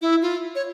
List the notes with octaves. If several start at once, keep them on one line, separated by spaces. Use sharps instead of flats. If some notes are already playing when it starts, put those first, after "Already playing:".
E4
F4
C#5